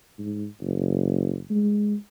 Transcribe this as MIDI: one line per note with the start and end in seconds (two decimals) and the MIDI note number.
0.19 0.46 44
0.62 1.42 30
1.50 1.94 56